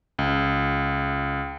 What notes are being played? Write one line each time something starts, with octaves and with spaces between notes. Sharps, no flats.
C#2